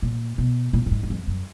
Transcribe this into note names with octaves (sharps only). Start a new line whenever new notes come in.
A#2
B2
A#2
A#2
G#2
F#2
F2
F#2